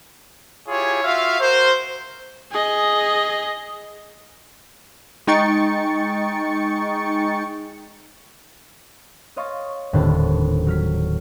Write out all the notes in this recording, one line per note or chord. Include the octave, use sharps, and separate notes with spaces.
E4 F4 G4 G#4 C#5
F4 F#4 E5 F5
F#4 A#4 C5
G#4 D#5
G#3 D#4 G5 C#6 A6 C#7
C#5 D#5 F5 C6 C#6 A6
D#1 A2 D3 B4 C5 A5
F#3 F6 B6